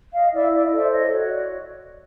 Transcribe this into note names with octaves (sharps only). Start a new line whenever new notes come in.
D#5 F5
E4 D5 E5
D5 E5
D#5
A4 C5 D5 E5
C#5 D#5
F#4 C#5
D#5
D5